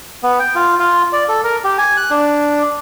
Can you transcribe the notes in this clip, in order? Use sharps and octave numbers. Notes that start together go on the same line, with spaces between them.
B3
G5
F4
F4
D5
A4
A#4
G4
G#5
F#6
D4